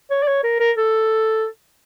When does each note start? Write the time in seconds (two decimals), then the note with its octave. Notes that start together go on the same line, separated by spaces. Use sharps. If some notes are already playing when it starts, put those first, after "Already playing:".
0.11 C#5
0.23 D5
0.28 C#5
0.44 A#4
0.60 A#4
0.77 A4